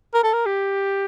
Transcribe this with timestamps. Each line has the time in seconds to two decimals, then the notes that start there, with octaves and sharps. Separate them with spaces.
0.14 A#4
0.23 A4
0.33 A#4
0.46 G4